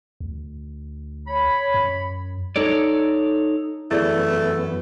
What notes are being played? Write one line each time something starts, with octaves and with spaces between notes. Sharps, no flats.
D2
C#5 B5
F#2
D#4 A4 C#5 D5
F#2 E3 A3 B3 E4 G#4 D5